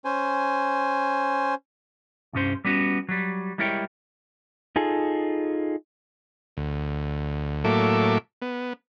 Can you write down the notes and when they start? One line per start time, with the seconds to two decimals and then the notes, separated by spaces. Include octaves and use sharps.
0.05 C#4 C5 G#5
2.33 C2 G2 C#4 C5
2.65 G3 B3 C#4 F#4
3.09 F#3 G3
3.58 G3 G#3 E4 A#4 C#5 G5
4.76 D#4 F4 G#4 A4
6.57 D2
7.64 A2 F#3 A#3 A4 E5 D6
8.42 B3